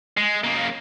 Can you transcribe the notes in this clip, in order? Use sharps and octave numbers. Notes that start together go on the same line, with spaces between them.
G#3
C#3 A#3